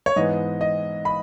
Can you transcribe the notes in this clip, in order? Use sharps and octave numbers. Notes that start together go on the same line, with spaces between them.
C#5
G#2 E3 B3 D#5
D#5
B5